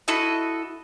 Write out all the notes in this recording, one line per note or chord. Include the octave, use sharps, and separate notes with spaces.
E4 F#4 A4 D#5